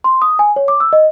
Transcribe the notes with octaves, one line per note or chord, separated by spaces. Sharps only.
C6
D#6
G#5
C#5
D6
E6
D#5